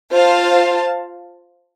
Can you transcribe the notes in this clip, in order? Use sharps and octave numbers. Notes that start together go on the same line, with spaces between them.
F4 C5 F5 A5